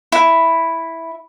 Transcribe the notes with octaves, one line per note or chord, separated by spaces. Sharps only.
E4